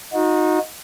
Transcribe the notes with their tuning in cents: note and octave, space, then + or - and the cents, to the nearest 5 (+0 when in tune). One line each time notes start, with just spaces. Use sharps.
D#4 +0 F#4 -35